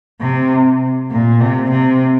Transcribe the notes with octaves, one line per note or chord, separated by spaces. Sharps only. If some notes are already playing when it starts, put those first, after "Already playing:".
C3
A#2
C3
C3